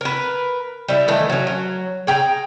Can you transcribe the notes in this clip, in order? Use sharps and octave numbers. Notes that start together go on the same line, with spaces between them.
A#4 B4
G3 E4
D#3 E3 A3
F#3 C#4
F#3
G#4 G5 A#5